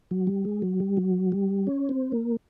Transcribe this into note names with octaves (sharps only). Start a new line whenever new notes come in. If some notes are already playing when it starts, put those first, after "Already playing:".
F#3
G3
G#3
F#3
G3
F#3
G3
C#4
C4
A#3